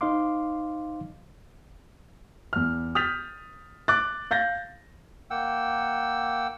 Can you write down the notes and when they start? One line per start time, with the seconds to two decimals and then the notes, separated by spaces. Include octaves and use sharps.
0.01 D#4 C5 D#5 F5 C6 D6
2.53 E2 F6
2.95 D#6 F6 G6 A6 B6 F7
3.88 D6 F#6 A6
4.31 F5 G6 A6 A#6
5.30 A#3 F#5 G5 E6